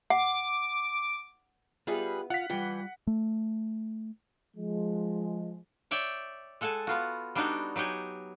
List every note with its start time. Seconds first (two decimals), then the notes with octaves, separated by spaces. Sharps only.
0.10 F#5 D6
1.87 G3 B3 F4 G#4 B4 E5
2.30 F4 F5 F#5 B6
2.50 E3 G3 F4 G5
3.07 A3
4.56 F3 G#3
5.91 C#5 D5 E5 G5
6.61 G#3 A4 F#5 G#5 A5
6.87 B3 F4 F#4
7.35 G3 B3 D4 D#4 F#4
7.76 F#3 D#4 G4 F#5 G#5